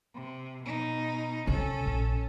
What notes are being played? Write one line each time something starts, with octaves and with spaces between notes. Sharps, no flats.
C3
B2 D#4
C2 C#4 A4
A#1